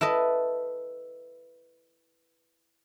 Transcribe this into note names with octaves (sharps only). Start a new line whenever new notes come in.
E4 A4 B4 D#5